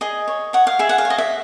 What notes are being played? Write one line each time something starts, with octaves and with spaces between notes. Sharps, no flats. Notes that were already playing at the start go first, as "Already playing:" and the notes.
G#4 D#5
C#5
C#5 F#5
F5
G#4 E5
F#5
F5
C#5
D#5
E5